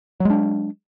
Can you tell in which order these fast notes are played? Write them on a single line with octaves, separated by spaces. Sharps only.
F#3 G#3 D4